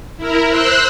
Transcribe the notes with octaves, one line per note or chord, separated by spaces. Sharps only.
E4 A#4
C5 E6 F#6